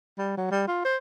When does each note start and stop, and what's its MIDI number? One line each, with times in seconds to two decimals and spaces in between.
0.18 0.35 55
0.37 0.47 54
0.51 0.63 55
0.67 0.82 65
0.85 0.97 72